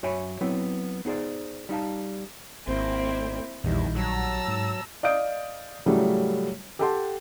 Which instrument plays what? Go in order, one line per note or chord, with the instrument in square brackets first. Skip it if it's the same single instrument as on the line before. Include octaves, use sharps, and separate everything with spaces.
[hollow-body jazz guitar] F#2 F#4 C#5 E5 G#5 B5
F#3 B3 C4 E4
B3 D#4 G#4 C5 D5
G3 D#4 F5 A5
[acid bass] G#1 [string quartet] A#3 C4 E4
[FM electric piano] A#1 G3 [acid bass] E2 [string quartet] D#3 E4
[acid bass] F#3 [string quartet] A5 A#5 E6
[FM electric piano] G#2
[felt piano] D5 D#5 F5 D#6 G6 D7
A2 C#3 F#3 G3 A3
G4 A4 F#5 G5 A5 C6